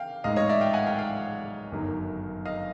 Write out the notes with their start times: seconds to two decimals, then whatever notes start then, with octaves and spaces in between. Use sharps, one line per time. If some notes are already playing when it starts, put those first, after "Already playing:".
Already playing: F5 G5
0.24 A1 G#2 D#3 G#3 D#5 F5
0.36 C#5 D#5
0.49 D5 E5
0.61 F5 G5
0.73 F#5 G#5
0.87 F5 G5
0.99 F5 G5
1.72 G1 F#2 D#3 F#3
2.46 D#5 F5